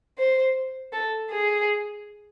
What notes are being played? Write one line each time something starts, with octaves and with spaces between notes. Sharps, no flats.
C5
A4
G#4